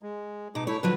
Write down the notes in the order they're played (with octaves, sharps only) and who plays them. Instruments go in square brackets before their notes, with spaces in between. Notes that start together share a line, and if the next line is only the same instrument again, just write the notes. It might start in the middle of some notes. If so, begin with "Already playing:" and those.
[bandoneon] G#3
[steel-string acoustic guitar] B2 [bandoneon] D#4 D6
[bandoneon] A3 E4 [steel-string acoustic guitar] C#5
[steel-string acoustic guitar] D3 F3 F#3 [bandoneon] B4